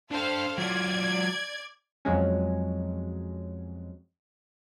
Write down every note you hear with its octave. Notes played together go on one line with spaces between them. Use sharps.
D4 A4 C5 F5 G5
F#3 F4 D5 G#6
F2 F#3 G#3 C#4